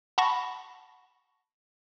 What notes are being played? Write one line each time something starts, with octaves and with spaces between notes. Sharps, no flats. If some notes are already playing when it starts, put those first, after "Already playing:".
F#5 A5 B5 C#6 A#6